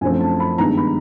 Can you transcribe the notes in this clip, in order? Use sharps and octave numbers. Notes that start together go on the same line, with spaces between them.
F#2 D3 F3 A3 C4 G#5
A5
B5
G2 D#3 G#3 B3 A#5
B5